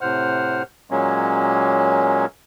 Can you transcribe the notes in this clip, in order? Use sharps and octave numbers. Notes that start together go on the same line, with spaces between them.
A2 C3 C5 F#5 F6
A#2 F#3 G#3 A#3 C#4